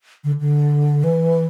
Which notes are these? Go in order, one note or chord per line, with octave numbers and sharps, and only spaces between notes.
D3
D3
E3